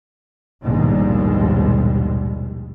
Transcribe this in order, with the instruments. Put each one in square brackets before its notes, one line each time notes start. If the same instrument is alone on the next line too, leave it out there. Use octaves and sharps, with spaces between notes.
[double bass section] A#1 D#2 G#2 B2 G3 G#3